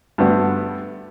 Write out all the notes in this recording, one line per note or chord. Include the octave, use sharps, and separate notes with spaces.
G2 D3 A3 B3 F#4